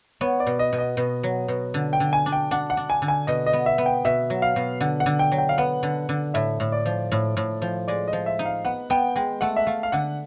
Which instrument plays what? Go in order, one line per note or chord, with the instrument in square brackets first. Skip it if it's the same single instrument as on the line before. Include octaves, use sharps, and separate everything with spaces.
[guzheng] B3 [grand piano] C#5
[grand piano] D5
[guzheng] B2
[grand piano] D#5
[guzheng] B2
[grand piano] D#5
[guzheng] B2
F#3
B2
D3
[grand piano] G5
[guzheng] D3
[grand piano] G#5
[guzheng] D4
[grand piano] G5
[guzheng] D4 [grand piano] F#5
[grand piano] F#5
[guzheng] D4
[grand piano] G#5
[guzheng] D3
[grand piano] G#5
[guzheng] B2 [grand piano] D#5
[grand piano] D#5
[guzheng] B3
[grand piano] E5
[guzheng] B3
[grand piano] G5
[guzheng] B2 [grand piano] E5
[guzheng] F#3
[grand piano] F5
[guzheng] B2
[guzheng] D3 [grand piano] F#5
[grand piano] F#5
[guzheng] D3
[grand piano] G5
[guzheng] F#3
[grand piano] G5
F5
[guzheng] B3 [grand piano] F#5
[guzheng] D3
D3
[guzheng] A2 [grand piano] E5
[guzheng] A2
[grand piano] D5
[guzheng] F3
A2
A2
F3
[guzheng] G#3 [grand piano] D5
[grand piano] D#5
[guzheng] F3
[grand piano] E5
[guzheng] D#4
[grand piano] F5
[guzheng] B3 [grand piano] F#5
[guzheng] B3 [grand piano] G5
[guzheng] G#3 [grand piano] G5
[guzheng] A3 [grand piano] F#5
[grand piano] E5
[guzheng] A3 [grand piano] F5
[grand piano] F5
[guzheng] D3 [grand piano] F#5